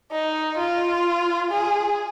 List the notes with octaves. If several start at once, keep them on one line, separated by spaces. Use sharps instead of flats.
D#4
F4
G#4